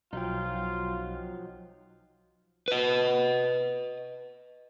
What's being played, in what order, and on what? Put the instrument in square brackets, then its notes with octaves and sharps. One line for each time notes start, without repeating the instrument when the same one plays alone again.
[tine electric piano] B1 G5 [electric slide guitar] F3 F#3 D#4 [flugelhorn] F4
[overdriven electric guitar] B4 D#5